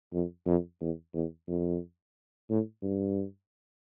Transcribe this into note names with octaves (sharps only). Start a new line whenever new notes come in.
F2
F2
E2
E2
F2
A2
G2